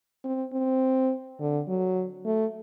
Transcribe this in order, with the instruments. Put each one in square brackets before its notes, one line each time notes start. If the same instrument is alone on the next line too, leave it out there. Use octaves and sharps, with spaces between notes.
[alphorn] C4
C4
D3
F#3
A3